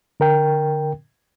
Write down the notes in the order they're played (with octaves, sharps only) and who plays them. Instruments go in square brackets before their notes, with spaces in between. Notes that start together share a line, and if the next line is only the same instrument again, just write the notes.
[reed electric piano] D3 A#4 G5